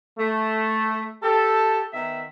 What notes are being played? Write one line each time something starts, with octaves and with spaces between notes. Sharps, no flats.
A3
G4 A4
D#3 B3 E5